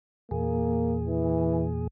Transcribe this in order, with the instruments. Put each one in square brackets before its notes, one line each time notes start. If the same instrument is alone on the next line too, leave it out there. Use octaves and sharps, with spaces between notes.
[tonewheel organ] E2 A#2 G#4 [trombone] A#3
[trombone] E3